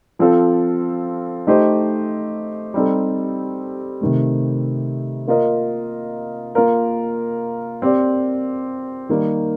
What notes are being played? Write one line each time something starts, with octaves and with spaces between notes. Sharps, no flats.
F3 C4 F4 A4
A3 D#4 G4 C5 D#5
G3 C4 D#4 A4
C3 D#3 A3
A#3 F4 A#4 D#5
A#3 F4 A#4
C4 G4 D5
D#3 G3 A#3 D#4